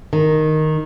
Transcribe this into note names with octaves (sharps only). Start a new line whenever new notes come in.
D#3